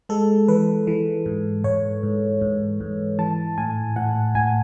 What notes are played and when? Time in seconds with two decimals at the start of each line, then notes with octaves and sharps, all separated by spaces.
0.09 G#3 A4
0.48 E3 B4
0.87 E3
1.26 G#2
1.64 G#2 C#5
2.03 G#2
2.41 G#2
2.80 G#2
3.19 E3 A5
3.58 A2 G#5
3.96 A2 F#5
4.35 A2 G#5